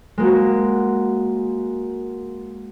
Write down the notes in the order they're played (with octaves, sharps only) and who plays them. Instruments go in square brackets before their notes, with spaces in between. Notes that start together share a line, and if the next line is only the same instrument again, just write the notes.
[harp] G#3 A#3 F#4